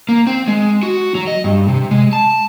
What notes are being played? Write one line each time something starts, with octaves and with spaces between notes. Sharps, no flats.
A#3
C4
G#3
F#4
F#3
D#5
G2
C3
G#3
A5